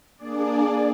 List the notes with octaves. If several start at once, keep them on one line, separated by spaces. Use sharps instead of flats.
A#3 D4 G#4 D5